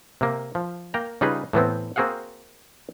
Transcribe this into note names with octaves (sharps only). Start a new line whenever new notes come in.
C3 A#3
F3
A#3 G5 A#5
C#3 G3 D#4 F4 G#4 B4
A2 E3 B3 C4
A#3 C4 F#4 G#4 F5 F#5